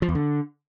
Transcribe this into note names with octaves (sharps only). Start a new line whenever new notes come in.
F3
E2
D3